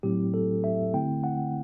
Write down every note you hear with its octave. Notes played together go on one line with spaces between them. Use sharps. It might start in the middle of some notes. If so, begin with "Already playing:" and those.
A2 F#3 A3 C4 E4 G4
A4
E5
D3 A3 C4 E4 G5
F#5